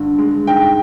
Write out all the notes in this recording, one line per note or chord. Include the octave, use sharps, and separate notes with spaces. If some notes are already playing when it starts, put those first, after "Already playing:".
Already playing: G2 D3
G#3
G#2 G5